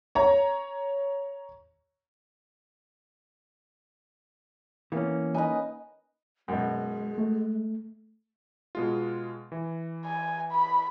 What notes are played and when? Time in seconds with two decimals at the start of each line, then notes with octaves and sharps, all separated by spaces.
0.15 C#5 A#5
4.92 E3 A#3 B3 C#4
5.34 D#4 B4 D#5 G#5
6.48 F#2 B2 G#3
7.18 A3
8.75 B2 G#3 F4
9.52 E3
10.06 G#5
10.52 B5